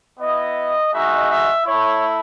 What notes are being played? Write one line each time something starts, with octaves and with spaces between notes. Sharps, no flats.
B3 E4 D#5
G#3 D#4 F#4 E5
E5
A3 E4 C#5